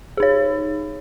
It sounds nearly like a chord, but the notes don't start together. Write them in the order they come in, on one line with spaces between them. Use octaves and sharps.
G#4 D#4 C#5